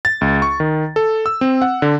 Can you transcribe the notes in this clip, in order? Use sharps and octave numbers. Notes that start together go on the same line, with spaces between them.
A6
C#2
C#6
D#3
A4
E6
C4
F#5
D3